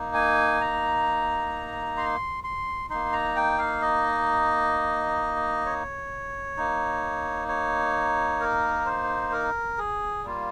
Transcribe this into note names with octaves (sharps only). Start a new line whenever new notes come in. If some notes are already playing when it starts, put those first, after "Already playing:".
Already playing: A#3 D#4
G#5
A#5
C6
C6
A#3 D#4 C6
A#5
G5
F5
D#5
C#5
A#3 D#4
C#5
A#4
C5
A#4
G#4
G3 A#3 F4